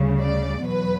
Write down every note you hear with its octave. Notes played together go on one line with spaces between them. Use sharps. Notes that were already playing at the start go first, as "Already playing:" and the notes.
Already playing: D2 C#3 G3
D5
E2 B2 F#3 B4